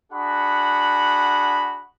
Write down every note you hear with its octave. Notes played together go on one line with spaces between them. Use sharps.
D4 F#4 G#4 F#5 B5